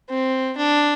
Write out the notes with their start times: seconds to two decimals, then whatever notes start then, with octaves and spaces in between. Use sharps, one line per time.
0.10 C4
0.57 D4